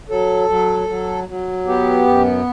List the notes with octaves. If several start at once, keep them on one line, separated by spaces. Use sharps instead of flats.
F#3 A4
F#3
F#3
F#3
B3 G4
F#2